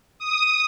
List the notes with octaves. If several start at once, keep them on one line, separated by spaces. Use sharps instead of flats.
D#6